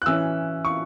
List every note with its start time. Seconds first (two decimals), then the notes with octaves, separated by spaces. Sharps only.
0.02 F#6
0.06 E3 C#4 E6
0.65 C#6